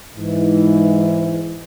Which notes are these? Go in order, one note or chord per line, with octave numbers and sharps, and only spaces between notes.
G#2 E3